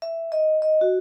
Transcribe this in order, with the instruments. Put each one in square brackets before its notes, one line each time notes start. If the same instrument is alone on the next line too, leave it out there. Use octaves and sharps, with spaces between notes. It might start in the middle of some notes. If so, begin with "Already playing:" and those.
[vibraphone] E5
D#5
D#5
F#4